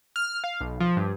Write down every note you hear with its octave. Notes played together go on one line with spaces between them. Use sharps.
F6
F5
B1
F3
G2